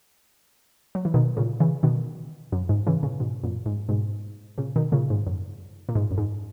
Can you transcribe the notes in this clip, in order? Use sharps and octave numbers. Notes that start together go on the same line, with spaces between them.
F#3
E3
B2 D#3
A#2 C#3
C#3 E3
B2 D#3
F#2
G#2
C#3 E3
A#2 C#3
G#2 B2
F#2 A#2
G#2
G#2 B2
A#2 C#3
B2 D#3
A#2 C#3
G#2
F#2
A#2
G#2
F#2
G#2